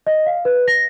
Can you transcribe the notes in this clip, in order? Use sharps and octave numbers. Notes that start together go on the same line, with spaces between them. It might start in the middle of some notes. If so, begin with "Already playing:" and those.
D#5
F5
B4
A#6